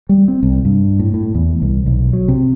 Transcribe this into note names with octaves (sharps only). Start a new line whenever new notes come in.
G3
C4
C2
G2
A2
A2
E2
C2
B1
F#3
C3